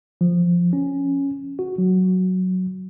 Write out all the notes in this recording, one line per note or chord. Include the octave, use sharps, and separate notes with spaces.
F3
C#4
F#4
F#3